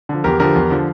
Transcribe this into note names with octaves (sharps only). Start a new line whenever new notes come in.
D3 F3
E2 G4 A#4
D3 F3 G4 A#4
E2
D3 F3